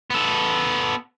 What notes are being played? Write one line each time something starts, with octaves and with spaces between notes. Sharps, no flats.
B3 A4